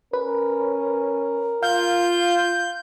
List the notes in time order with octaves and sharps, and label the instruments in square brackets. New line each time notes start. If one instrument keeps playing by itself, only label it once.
[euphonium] C#4 [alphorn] A#4 [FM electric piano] B4
[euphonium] F4 [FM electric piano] F5 [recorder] G6